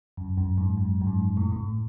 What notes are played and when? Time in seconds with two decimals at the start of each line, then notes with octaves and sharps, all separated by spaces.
0.17 F#2
0.37 F#2
0.58 G#2
0.77 F#2
1.01 F#2
1.07 G#2
1.37 A2
1.52 A2